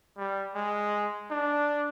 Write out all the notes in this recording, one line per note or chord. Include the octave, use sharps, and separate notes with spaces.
G3
G#3
D4